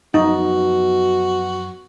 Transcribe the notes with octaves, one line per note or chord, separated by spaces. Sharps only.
F#2 B2 F3 D#4 F#4